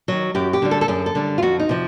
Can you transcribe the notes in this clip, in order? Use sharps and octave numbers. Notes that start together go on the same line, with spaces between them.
D#3 F#3
F#2 G4
G4
D3 G3
A4
A4
F#2 G#4
A4
D3 G3
F4
F2 F#4
D#4
C3 F3